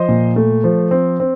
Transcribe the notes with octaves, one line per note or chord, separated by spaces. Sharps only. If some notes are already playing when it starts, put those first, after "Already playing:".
Already playing: F3 C5 D#5
A#2
A3
F3
C4
C4